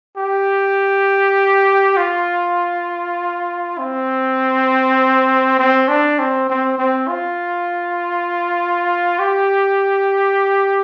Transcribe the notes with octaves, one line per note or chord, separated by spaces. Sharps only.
G4
F4
C4
C4
D4
C4
C4
C4
F4
G4